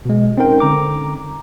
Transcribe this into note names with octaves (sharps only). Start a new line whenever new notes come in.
B2 G#3
C4 C#4 D#4 A#4 G5
D3 A#5 D6